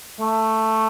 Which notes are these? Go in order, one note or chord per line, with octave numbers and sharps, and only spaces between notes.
A3